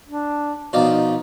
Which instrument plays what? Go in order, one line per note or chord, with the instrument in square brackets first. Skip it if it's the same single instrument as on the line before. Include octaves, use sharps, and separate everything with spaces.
[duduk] D4
[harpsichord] B2 F3 D5 [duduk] D#4